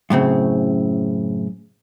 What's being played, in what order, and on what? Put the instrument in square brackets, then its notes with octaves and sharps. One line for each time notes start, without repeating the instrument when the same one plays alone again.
[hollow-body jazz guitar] F#2 A2 C#3 C4